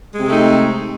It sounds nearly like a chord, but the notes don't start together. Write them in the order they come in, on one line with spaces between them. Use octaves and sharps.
G#3 C3 C4 A3 D#4